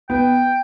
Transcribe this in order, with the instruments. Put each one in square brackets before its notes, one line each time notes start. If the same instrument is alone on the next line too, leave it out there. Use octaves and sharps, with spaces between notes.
[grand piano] B3 [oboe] G5